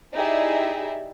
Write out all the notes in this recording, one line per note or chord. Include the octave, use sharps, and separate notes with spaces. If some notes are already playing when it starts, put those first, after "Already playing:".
D#4 E4 G4 G#4 D5 E5